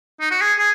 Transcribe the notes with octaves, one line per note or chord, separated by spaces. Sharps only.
D#4
F#4
G#4
G#4